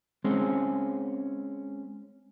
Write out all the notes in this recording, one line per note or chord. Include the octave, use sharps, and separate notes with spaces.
G#3 C4 C#4 G#4